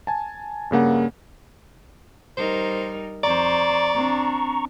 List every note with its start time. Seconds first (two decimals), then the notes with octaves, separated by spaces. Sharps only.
0.07 G#5 A5
0.71 G2 C#3 A#3 F#5
2.37 G3 D#4 A#4 C5
3.23 F2 C5 D5 A#5 C#6
3.94 C4 D4